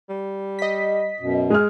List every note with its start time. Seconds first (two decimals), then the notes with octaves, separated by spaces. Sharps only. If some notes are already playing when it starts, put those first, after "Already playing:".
0.09 G3
0.59 D#5 B6
1.20 F#2 B2
1.50 G#3 G#4 F6